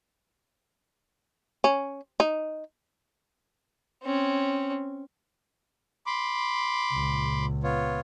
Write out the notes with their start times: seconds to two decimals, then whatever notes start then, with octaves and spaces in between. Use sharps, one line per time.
1.64 C#4
2.20 D#4
4.03 C4 C#4
6.06 B5 C6 D6
6.92 C#2 A#2
7.63 B3 F4 C#5